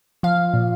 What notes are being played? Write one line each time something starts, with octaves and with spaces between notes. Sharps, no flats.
F3 F5
A#2